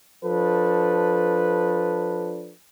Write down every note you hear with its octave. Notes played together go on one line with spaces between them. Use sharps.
F3 D4 A4 B4